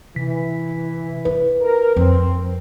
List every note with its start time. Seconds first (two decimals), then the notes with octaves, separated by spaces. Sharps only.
0.16 C3 E3 B6
1.25 E4 B4
1.61 A#4
1.96 F2 C4